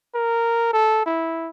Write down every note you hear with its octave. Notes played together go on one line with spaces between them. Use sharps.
A#4
A4
E4